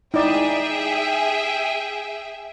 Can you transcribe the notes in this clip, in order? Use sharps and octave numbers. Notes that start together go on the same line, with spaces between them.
D#4 E4 G#4 D5 E5 G5